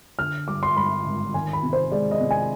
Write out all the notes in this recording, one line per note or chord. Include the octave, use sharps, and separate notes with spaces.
D3 F6
G2 D6
C6
G2 B5
G#1
D#3 G#5
B5
C3
C5
G#3 D5
D#5
C3
G#5